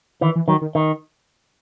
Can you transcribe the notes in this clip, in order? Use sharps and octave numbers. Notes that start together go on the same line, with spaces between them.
D#3 E3
E3
D#3 F#3
D#3
D#3